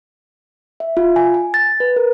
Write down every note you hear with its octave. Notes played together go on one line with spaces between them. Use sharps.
E5
F4
G#5
G#5
A6
B4
A#4